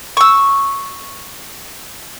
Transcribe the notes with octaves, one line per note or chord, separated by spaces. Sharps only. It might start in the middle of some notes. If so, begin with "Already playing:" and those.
C#6 E6